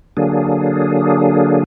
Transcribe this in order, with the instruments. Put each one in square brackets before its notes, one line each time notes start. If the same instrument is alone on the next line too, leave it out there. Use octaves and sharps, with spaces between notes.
[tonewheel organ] D3 F#3 A#3 D4 G#4